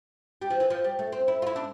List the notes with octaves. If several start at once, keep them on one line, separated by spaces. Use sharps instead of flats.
G3
F3
E3
F3
G3
A3
C4
E4
F4
E4
D4